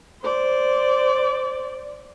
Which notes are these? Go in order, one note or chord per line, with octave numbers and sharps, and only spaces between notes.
C5 D5